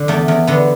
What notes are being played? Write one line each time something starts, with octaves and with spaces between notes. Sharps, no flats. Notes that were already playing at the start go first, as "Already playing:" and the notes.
Already playing: D3
E2 A3
E2
D3 B3